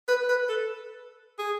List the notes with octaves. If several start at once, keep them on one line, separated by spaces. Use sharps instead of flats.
B4
B4
A4
G#4